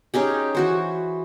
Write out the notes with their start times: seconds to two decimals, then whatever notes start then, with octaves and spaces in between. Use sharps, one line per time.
0.14 C#4 D#4 G4 G#4
0.55 E3 F#4 C5